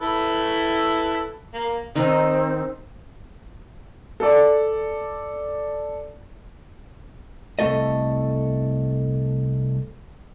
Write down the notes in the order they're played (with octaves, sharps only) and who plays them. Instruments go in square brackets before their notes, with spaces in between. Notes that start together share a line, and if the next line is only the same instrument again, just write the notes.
[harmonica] E4 A4 B4
A#3
[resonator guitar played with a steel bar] D#3 D#4 [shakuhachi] C4
[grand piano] A4 D5
[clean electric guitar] C2 D#3 A3 A4 D#5